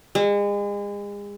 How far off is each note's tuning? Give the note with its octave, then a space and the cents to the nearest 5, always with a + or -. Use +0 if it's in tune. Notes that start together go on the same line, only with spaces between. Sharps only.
G#3 -35